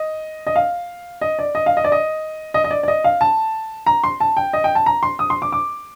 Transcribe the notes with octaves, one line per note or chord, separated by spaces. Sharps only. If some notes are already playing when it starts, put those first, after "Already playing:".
Already playing: D#5
D#5
F5
D#5
D5
D#5
F5
D#5
D5
D#5
D#5
D#5
D5
D5
D#5
F5
A5
A#5
C6
A5
G5
D#5
G5
A5
A#5
C6
D#6
C6
D6
D6